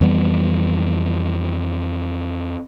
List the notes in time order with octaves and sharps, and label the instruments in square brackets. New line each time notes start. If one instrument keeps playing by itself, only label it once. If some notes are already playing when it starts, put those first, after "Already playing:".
[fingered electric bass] F2 E3 G3 B3